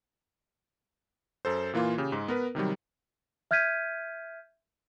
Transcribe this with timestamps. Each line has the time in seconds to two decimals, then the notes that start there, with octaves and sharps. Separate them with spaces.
1.45 F#2 A4 C5
1.73 A#2 E3 A#3 F4
1.98 C#3 G4
2.12 G#2 G#3
2.28 B3 A#4 B4
2.55 C3 D#3 F#3 G3
3.51 E5 F6 G6 G#6 B6 D#7